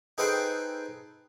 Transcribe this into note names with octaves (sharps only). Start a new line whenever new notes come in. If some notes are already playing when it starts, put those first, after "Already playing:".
D#4 G#4 A4 B4 C5 G5